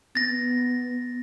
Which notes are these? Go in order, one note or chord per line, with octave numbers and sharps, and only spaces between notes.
B3 A6 A#6